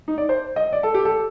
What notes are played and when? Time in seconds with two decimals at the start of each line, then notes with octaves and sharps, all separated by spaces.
0.08 D#4
0.18 D5
0.29 C5
0.56 D#5
0.73 D5
0.83 A4
0.94 G4
1.05 A4